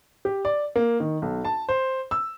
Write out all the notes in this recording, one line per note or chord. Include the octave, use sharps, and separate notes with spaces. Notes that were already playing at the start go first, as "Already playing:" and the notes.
G4
D5
A#3
D#3
B1
A5
C5
E6